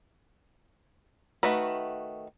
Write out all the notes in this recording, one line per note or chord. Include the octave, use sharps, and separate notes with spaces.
D#3 A3 F#4 B4